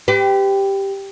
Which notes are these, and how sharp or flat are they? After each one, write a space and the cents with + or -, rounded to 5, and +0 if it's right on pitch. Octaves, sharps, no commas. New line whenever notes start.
G4 +0 B4 +45